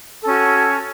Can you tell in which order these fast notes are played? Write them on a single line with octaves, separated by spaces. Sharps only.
A4 C#4 F#4